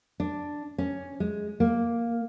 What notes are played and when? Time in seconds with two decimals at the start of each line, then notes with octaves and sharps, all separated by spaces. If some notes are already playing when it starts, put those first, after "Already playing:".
0.20 D4
0.78 C#4
1.20 G#3
1.60 A#3